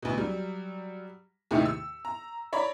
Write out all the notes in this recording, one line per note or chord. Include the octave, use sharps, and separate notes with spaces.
D2 B2
F#3 G3
D#2 A2 C3 D#3 E5 C#7
E6
A#5
C#5 D5 A#5 B5